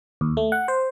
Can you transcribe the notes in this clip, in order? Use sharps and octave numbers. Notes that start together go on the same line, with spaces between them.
D#2
A3
F#5
C5